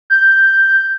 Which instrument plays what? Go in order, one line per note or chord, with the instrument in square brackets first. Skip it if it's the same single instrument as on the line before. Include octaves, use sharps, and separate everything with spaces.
[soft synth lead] G6